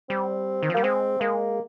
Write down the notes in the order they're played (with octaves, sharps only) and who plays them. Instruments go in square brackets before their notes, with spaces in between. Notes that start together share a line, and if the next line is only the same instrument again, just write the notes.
[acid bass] G3 [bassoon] C4
[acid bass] D#3
F3
[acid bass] G3 [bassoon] A#3
[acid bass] G#3 [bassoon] C4
[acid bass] G#3 [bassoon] A#3